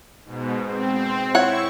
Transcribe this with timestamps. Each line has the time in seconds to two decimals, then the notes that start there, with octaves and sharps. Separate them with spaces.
0.24 G#2 B2
0.63 C4
1.35 E4 C#5 F#5 C#6